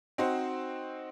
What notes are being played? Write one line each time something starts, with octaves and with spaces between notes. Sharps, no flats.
C4 D#4 F#4 C5